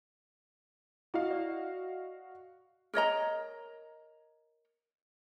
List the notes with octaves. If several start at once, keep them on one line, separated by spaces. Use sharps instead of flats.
E4 F#4 D#5 F5
D5
A#4 C#5 D#5 A#5